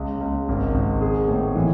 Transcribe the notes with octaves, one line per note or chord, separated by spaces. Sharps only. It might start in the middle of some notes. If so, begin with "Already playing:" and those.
Already playing: C#2
C#2
G#1
G#1
G#4
A2
E3